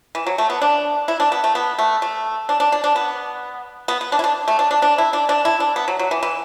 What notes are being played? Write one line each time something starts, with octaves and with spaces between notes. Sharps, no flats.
E3
F#3
A3
B3
D4
E4
D4
B3
A3
B3
A3
A3
D4
D4
D4
D4
B3
B3
B3
D4
E4
D4
A3
D4
D4
D4
E4
D4
D4
E4
D4
B3
F#3
F#3
E3
E3